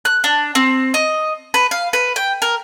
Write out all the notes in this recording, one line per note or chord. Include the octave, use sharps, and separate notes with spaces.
F#6
D4
C4
D#5
B4
F5
B4
G5
A#4